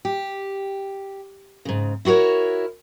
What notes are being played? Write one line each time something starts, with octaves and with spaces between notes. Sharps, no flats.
G4
G#2 C#3
E4 F#4 G#4 A#4 C#5